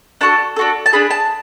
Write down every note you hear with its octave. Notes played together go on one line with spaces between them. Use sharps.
D4 F#4 A4 A5
D4 F#4 A4
A5
D4 G#4 B5
A5